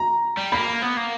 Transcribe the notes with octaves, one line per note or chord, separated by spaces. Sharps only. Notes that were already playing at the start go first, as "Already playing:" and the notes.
Already playing: A#5
G3
A#3 B5
B3
A#3